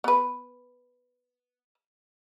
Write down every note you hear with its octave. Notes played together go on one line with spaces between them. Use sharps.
B3 B4